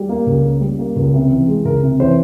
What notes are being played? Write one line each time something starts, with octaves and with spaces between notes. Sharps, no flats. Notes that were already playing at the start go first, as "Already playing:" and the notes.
Already playing: G3
A#3
C#2
C#3
G3
A#3
C#2
C3
E3
G#3
C#2 A#4
C3
E3 C5